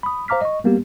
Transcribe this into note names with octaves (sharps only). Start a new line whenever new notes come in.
B5 D#6
C5 F5 A#5 D6 F6 B6
D#5 C#6
G3 A#3 B3 G4